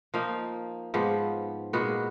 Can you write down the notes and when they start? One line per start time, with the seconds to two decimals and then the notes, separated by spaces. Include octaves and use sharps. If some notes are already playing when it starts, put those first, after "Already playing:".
0.14 F3 A#3 D#4
0.94 G#2 F3 B3
1.73 A#2 G#3 B3 F#4